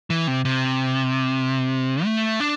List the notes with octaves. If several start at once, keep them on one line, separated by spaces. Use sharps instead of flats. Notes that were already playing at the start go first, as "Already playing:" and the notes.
E3
C3
C3
A3
D4